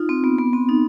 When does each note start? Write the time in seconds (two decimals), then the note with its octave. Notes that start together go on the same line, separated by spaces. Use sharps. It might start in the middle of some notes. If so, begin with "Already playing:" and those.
Already playing: D#4 F4
0.09 C4
0.24 B3
0.38 B3
0.53 C4
0.69 D#4